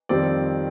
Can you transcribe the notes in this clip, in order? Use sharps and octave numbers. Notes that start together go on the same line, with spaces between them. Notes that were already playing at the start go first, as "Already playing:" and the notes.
F2 D#3 G3 C4 D5